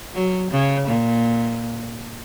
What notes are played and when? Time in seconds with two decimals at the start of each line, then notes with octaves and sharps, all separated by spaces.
0.14 F#3
0.51 C#3
0.88 A#2